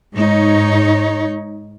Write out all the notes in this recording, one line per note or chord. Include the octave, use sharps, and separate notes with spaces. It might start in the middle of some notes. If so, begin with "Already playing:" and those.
G#2 D#4 C#5